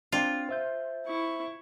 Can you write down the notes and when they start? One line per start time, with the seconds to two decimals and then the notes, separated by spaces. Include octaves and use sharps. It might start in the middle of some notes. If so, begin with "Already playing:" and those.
0.12 C4 D4 F4 G5
0.49 C5 E5 G6
1.07 E4 C#6